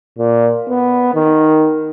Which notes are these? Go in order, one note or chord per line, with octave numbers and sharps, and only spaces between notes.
A#2
B3
D#3